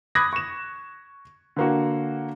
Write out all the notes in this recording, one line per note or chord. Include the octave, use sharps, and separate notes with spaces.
B5 D6 D#6 F#6 G#6 A#6
C#6 E7
D3 A#3 F#4